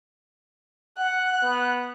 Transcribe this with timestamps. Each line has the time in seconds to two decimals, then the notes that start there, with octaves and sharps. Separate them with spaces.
0.98 F#5 F#6
1.42 B3